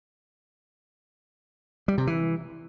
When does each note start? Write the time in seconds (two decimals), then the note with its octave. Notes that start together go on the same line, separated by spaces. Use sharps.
1.88 G3
1.98 C3
2.07 E3